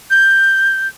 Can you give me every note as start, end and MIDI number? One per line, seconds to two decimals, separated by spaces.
0.11 0.88 91